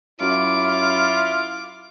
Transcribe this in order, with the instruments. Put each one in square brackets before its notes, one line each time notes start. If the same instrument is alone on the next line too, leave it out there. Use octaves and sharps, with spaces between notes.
[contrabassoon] F#2 [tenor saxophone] E4 [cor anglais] F4 [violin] D6